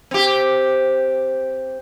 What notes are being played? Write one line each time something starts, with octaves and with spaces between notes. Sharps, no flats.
C4 G4